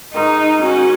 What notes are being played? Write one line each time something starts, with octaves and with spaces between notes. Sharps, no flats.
G#2 D#3 D#4
C#4 F#4